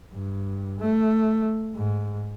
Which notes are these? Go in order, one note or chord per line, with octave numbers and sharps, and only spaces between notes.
G2
A3
G#2